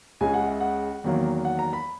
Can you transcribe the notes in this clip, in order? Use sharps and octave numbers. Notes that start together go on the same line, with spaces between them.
C#2 C#3 G#3 G#5
F#5
E5
F#5
E2 D#3 F#3 A#3
F#5
A#5
B5